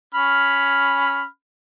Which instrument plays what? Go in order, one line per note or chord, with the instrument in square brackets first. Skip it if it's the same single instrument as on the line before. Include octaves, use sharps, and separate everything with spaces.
[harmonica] C#4 B5 F6